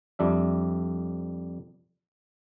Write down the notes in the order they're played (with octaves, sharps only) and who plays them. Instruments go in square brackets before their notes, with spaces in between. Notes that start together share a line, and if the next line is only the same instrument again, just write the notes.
[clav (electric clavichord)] F2 G3 D4 E5